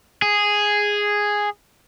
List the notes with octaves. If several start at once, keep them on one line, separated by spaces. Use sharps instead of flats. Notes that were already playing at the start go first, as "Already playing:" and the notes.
G#4